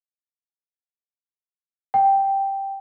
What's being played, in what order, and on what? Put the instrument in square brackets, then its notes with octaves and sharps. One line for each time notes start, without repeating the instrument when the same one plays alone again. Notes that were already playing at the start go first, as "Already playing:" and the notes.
[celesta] G5